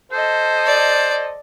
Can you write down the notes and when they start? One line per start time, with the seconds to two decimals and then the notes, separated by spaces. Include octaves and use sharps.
0.12 A4 C5 D#5
0.66 D5